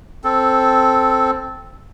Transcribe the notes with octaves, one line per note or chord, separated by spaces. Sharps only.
C4 A4